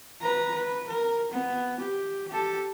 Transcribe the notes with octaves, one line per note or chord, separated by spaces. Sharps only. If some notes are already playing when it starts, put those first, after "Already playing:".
B4 A#5
B4
A#4
B3
G4
G4 A4